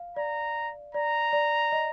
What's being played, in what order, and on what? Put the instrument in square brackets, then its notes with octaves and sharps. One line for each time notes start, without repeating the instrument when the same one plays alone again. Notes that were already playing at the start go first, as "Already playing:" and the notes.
Already playing: [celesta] F5
[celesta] D5 [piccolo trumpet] A#5
[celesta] D5 [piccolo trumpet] A#5
[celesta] D5
D#5